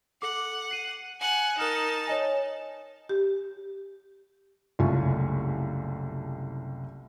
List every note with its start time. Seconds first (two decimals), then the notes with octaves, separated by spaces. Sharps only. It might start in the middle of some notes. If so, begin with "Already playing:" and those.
0.22 A4 F#5 D6
0.71 C7 D#7
1.20 F#5 G#5
1.57 D#4 A#4 A5 F6 E7
2.07 C#5 D#5 G#5
3.09 G4
4.79 F#1 C2 A3 F4 G#5 C#6